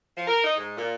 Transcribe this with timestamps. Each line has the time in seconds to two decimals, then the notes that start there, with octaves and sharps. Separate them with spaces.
0.16 F3
0.28 A#4
0.44 D#4
0.57 G#2
0.76 A#2